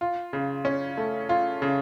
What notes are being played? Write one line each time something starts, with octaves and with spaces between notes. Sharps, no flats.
F4
C#3
C#4
A3
F4
C#3